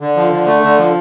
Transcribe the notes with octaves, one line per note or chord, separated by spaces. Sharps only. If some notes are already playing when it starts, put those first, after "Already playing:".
D3
F3
D3
A3
D3
F3